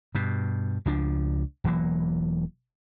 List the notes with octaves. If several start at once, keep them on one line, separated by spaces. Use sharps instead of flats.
G2 B2
C#2 F3 D4
E1 E3 F#3 A#3